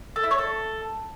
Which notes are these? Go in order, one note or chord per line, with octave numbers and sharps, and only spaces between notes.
A4
E4
C#5
A4